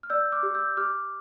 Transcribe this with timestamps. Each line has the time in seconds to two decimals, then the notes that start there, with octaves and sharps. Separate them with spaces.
0.03 F6
0.10 D5 E6 G6
0.32 D6 F6
0.43 G4
0.54 E6 G6
0.77 G4 D6 F6